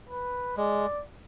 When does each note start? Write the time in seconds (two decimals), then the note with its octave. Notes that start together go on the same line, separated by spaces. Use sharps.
0.09 B4
0.57 G#3 D5